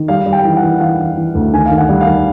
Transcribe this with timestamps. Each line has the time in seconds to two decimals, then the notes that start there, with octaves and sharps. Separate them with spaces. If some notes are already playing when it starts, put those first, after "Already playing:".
Already playing: D#3
0.08 G3 F5
0.26 G3
0.32 G5
0.45 E3
0.57 F#5
0.63 E3
0.80 E3 F5
0.99 E3
1.17 E3
1.35 D2
1.52 D#3 G#5
1.66 F5
1.71 D#3
1.78 F#5
1.89 G3
2.01 F5
2.07 D#3